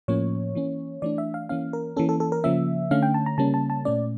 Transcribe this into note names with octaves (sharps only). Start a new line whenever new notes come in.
A2 F3 A#3 C#4 C#5
E3 A#3 C#4
E3 A3 D4 D5
E5
F5
E3 A#3 C#4 F5
A#4
E3 A#3 C#4 A4
A4
A4
A#4
C#3 F3 A#3 C#4 E5
D3 A3 C#4 F5
G5
A5
A#5
C#3 G3 A#3 C#4 A5
A5
A5
A#2 A3 C#4 D5